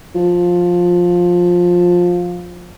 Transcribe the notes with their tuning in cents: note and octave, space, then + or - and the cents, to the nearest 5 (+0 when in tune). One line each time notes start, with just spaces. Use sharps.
F3 +15